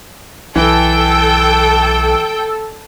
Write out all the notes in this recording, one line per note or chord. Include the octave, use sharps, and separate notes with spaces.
B1 E3 A4 G5